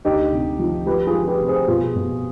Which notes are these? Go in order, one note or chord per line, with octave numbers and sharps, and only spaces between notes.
D2 D#4 G4
C3
F3
F3 G4 B4
F4 G#4
F3
G4 B4
C3
G#4 C5
B2 F4 G#4
B2